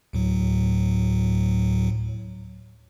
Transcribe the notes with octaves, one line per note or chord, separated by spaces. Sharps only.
D2 A2 F#3